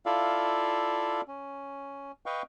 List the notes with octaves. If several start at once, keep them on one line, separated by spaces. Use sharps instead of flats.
E4 F4 A4 D5 E5 F5
C#4
B4 D#5 F5 G5 C#6